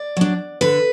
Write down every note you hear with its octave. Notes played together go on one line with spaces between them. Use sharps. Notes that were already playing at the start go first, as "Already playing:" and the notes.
Already playing: D5
F#3 D4
D3 B4